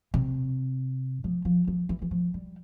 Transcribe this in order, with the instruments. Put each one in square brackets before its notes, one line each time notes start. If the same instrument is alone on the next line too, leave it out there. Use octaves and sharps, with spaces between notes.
[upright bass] C3
F3
F3
F3
E3
E3
F3
G3